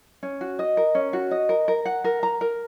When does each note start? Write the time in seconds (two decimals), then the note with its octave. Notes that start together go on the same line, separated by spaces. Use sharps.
0.23 C#4
0.41 F#4
0.59 D#5
0.77 A#4
0.95 C#4
1.13 F#4
1.31 D#5
1.49 A#4
1.68 A#4
1.85 F#5
2.04 A#4
2.23 A#5
2.41 A#4